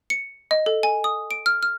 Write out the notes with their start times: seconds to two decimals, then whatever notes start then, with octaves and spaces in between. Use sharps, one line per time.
0.10 C#7
0.51 D#5
0.66 A4
0.83 G#5
1.04 D#6
1.31 D7
1.46 F6
1.63 F6